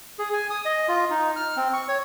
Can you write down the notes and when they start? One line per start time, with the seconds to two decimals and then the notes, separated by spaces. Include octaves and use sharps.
0.19 G#4
0.33 G#5
0.50 D#6
0.65 D#5
0.88 F4
1.10 D#4
1.36 F6
1.57 C4
1.73 C#6
1.88 C#5